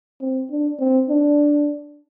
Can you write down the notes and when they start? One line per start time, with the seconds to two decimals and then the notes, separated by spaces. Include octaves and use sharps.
0.21 C4
0.50 D4
0.80 C4
1.09 D4